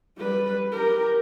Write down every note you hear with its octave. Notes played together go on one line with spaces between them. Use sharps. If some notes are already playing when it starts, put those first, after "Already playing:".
G3 B4
G4 A#4